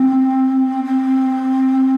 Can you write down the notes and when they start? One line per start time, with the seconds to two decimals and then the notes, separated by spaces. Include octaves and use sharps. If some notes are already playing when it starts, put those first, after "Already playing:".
Already playing: C4
0.84 C4